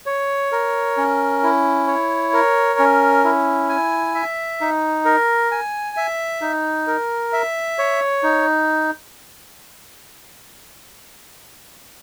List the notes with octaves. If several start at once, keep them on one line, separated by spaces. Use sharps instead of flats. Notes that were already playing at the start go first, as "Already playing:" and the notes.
C#5
A#4
C#4
E4
C#5
A#4
C#4
E4
G#5
E5
D#4
A#4
G#5
E5
D#4
A#4
E5
C#5
D#4